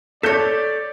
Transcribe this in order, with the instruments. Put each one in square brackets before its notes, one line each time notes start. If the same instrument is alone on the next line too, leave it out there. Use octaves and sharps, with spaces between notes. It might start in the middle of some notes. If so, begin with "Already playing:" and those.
[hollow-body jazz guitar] A4 C#5 [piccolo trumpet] D5 [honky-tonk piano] G6 B6